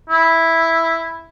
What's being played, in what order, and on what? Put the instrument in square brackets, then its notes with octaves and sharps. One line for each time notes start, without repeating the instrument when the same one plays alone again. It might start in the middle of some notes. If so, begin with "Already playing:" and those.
[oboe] E4